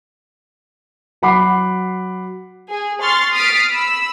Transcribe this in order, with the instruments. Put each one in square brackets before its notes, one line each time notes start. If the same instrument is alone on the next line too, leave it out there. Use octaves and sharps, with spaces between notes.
[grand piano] F#3 F#5 B5 D6 C7
[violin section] G#4
C6 C#6 F6 A6
D#6 F6 A6 B6 C7 D7
B5 E6